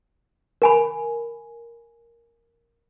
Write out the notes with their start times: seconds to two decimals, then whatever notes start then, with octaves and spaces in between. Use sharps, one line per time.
0.62 A#4 G#5 B5